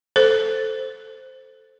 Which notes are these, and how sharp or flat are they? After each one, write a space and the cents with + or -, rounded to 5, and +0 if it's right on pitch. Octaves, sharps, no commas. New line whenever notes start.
A4 +0 C5 +0